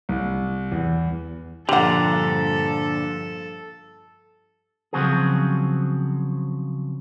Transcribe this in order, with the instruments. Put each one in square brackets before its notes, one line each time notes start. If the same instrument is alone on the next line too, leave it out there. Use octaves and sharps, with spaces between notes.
[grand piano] C2
E2
[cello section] G2 F3 [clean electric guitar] A#2 D3 [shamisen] G4 F#5 [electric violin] A4
[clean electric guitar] C#3 F3 F#3 C4 F#4 G#4